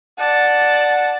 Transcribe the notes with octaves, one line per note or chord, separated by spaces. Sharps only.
D5 F#5 A5